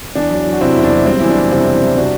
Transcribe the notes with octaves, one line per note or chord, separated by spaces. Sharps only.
E2 D4
F#3
F#3
F#4
C3 C4 E4
E1 E4
D4
F#3
G3 C4
E2 E4
D4
F#1
C3 C4 E4
E2
G3
C3 D4 F#4